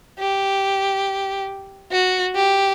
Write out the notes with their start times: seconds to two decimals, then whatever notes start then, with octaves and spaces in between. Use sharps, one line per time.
0.19 G4
1.92 F#4
2.35 G4